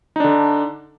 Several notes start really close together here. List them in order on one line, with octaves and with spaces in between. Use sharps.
D#4 D4 D3